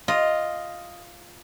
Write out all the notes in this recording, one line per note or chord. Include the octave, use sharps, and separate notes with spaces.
F4 D#5